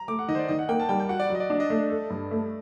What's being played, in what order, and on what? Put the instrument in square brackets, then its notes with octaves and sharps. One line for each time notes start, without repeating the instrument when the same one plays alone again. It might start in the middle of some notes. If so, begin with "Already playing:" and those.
Already playing: [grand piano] A#5
[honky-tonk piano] A3 [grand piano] D6
[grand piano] F#5
[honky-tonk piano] D#3 [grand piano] D#5
[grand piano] C5
D5
[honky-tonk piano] D#3 [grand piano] D#5
[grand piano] F#5
[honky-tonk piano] A#3 [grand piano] G5
[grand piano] A5
[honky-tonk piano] G3 [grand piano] G5
[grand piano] G5
[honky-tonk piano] F#4 [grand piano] F#5
[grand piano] D5
[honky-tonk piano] F#3
[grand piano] D#5
D5
[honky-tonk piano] D4
[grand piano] D#5
[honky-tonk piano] A3
A4
G2
A3